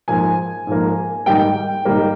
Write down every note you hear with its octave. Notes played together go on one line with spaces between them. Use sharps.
G#2 F3 A#3 G#5
G#2 F3 A#3
G#2 D#3 G3 A#3 G5
G#2 D#3 G3 A#3